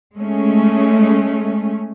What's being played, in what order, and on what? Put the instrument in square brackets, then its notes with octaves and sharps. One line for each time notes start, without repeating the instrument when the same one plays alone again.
[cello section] G#3 A3 C#4